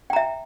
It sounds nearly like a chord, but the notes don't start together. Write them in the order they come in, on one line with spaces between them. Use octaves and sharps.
G5 A#5 E5